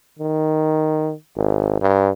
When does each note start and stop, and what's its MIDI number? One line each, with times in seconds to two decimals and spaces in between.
0.19 1.13 51
1.37 1.79 32
1.82 2.09 43